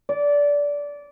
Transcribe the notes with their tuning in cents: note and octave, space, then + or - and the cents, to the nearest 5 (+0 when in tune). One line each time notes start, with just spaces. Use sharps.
D5 -20